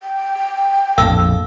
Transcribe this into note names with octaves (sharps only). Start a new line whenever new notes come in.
G5
A#1 F2 A2 A4 F5 E6